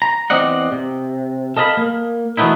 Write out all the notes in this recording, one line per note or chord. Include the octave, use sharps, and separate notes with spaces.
A#5
E2 C4 D5 D#5 F#5
C3
A4 D#5 F5 A5 B5
A#3
E3 F#3 A3 B3 D#4 E4